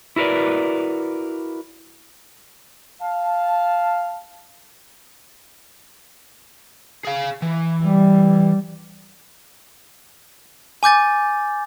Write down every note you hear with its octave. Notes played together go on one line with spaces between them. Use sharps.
E4 F#4 A#4 B4 D5
F5 A5
G#4 F5
E3
G3
G#5 D6 G6 A6